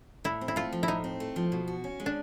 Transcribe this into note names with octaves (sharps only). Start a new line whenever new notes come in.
A2 E4
C4
E4
A3 F4
F3
E4
A2 D#4
C4
A3
F3
B2
F#4
C#4
G#3
D4